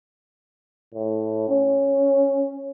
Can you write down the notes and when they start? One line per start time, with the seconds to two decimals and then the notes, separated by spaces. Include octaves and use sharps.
0.94 A2
1.49 C#4